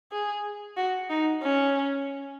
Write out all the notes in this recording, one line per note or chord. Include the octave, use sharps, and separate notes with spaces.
G#4
F#4
D#4
C#4